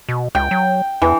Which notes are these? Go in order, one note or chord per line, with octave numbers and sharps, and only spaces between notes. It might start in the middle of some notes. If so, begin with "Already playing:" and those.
B2
C#2 G5
F#3
E2 E3